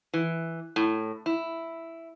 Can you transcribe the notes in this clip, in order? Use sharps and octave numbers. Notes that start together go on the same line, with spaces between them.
E3
A2
E4